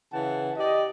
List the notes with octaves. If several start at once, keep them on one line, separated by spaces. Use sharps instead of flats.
C#3 E3 F#5 A5
G4 D5 D#5